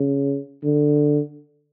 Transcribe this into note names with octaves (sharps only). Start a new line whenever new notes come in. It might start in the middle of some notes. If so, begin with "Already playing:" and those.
Already playing: C#3
D3